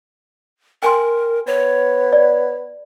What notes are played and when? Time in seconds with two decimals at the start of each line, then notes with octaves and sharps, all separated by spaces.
0.83 A#4 G5 G#5 C6
1.47 B3 C#5
2.13 D5